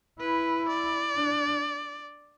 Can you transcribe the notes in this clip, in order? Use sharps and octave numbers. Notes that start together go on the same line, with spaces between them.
E4 B4
D5
D4